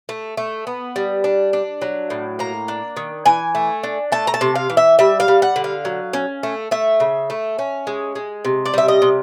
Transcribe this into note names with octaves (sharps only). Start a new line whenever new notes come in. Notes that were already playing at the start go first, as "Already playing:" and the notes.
A3
A3
B3
G3
D4
D4
F#3
A2
A#3 A#5
D4
D#3
E3 G#5
A3
D4
A3 A5
A#5
A5
C3
F5
E3
E5
G3 E5
F5
G3
F#5
D3
F5
F#3
C#4
A3
A3 E5
C#3
A3
C#4
G#3
G#3
C3
D5
G3 E5
D#5
C3